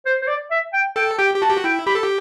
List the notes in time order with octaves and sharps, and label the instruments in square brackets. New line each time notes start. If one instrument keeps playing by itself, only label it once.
[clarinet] C5
C5
D5
E5
G5
[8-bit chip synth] A4 [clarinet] G5
[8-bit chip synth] G4 [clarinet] G5
[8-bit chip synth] G4
[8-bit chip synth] F#4 [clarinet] A5
[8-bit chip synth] G4
F#4
[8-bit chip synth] E4 [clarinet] G5
[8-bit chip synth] G4 [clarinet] B5
[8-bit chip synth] A4
G4